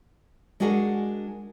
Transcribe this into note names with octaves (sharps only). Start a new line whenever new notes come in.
G#3 D4 F#4 G#4 A#4 F#5